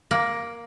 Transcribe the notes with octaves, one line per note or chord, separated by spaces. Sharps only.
A#3